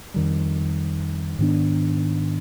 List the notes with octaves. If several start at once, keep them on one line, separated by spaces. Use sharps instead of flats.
F2 D#3 G3
G#2 D#3 B3 D4